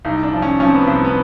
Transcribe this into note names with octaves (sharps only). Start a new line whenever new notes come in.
C2 D#4
D4
F3
C#4
F3 C#4
C4
B3
C4
C2
B3